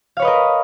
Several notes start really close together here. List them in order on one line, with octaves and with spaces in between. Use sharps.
F5 C#5 B4 D#5 A#4